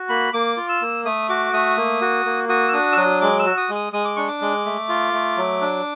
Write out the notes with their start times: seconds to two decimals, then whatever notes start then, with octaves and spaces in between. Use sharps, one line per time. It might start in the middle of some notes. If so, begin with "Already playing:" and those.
Already playing: F#4
0.09 A#3 B5
0.33 A#3 D6
0.57 F4
0.69 E6
0.82 A#3
1.05 A3 D#6
1.29 F#4 D6
1.53 A3 D#6
1.77 A#3
2.01 F#4
2.26 A#3
2.49 F#4 D#6
2.68 E6
2.73 D4 D#6
2.92 E6
2.97 F#3 D#6
3.21 G#3 D6
3.39 E6
3.46 F#4
3.57 D#6
3.69 G#3
3.75 D#6
3.93 G#3 D#6
4.05 D6
4.16 D4 C#6
4.28 D6
4.41 G#3
4.66 A3
4.89 F4
5.13 A3
5.37 F#3
5.61 D4